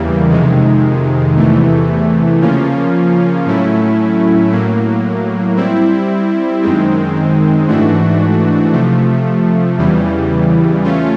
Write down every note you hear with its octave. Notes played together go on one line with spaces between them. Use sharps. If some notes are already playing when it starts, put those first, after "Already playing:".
Already playing: E2 C#3 E3 G3 A#3
F2 C3 D#3 G#3
E2 C3 E3 A3
C#3 F3 A#3 C#4 F4
A2 F#3 A3 C#4 E4
A2 F#3 A#3
G3 C4 E4
F#2 D#3 G#3 C4
G#2 E3 A3 D4 F#4
C3 F3 A3
E2 C#3 E3 G3
A3 C#4 F4